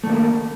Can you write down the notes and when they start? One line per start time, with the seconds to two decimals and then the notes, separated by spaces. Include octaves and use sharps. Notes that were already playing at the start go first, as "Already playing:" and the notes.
0.04 A3
0.07 D#3
0.10 A#3